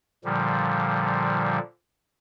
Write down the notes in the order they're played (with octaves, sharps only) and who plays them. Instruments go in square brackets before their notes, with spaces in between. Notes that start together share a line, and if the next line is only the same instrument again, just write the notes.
[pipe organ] A#2 D3 F3 G3